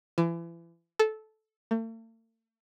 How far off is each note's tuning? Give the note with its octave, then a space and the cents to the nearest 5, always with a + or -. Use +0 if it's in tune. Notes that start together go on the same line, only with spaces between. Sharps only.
E3 +35
A4 -15
A3 +45